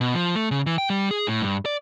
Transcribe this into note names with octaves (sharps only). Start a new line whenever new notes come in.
B2
F3
A3
C#3
E3
G5
G3
G#4
A2
G2
D5